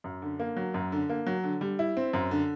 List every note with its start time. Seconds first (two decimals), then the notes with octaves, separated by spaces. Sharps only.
0.04 F#2
0.22 D3
0.40 A#3
0.57 F#3
0.74 F#2
0.92 D3
1.10 A#3
1.27 F#3
1.44 D3
1.61 G3
1.79 E4
1.97 C4
2.13 F#2
2.31 D3